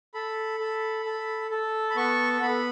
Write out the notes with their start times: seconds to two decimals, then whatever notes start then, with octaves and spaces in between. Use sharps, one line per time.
0.14 A4 B5
0.60 A4
1.05 A4
1.51 A4
1.90 B5
1.96 B3 C#6
2.42 B3 B5